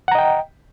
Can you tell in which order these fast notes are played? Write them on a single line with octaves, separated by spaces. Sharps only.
F#5 A#5 D#5 G5